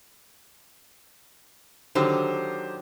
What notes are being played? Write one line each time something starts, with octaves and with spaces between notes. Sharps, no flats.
D3 D#3 F#3 G4 C5